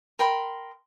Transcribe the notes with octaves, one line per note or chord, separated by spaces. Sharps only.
A#4 G5 B5 C6